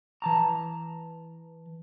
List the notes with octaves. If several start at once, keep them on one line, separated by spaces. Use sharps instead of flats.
E3 A5 A#5